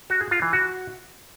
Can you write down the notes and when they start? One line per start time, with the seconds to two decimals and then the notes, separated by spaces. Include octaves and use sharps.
0.10 F#4
0.21 G#4
0.31 F4
0.42 E3
0.53 F#4